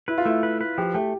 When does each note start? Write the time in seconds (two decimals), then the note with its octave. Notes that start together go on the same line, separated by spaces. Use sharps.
0.08 E4 B4
0.18 F4
0.26 A3 E4
0.43 B4
0.61 B4
0.78 F3 G4
0.94 A3 G4